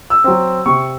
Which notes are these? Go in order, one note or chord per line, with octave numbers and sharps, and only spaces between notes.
E6
F#3 C4
C3 C#6